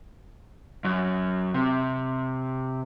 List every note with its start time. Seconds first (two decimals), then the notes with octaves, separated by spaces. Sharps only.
0.85 F#2
1.54 C3